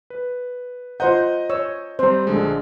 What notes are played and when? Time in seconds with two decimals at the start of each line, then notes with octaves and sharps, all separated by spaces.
0.10 B4
1.00 F4 C5 D#5 F#5 A#5 G6
1.50 C#5 E6
1.99 G3 C4 C5 A#5
2.27 A#1 D3 G#3